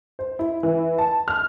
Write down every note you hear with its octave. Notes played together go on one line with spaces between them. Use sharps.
C5
E4
E3
A5
F6